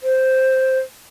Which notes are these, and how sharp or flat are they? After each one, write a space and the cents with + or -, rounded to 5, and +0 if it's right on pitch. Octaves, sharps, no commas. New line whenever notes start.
C5 +0